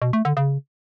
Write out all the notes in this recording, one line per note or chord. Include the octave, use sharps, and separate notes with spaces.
B2
A3
D3
C#3